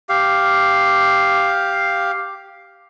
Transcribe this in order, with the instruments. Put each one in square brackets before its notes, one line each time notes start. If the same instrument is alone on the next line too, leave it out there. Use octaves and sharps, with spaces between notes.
[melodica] G4 F5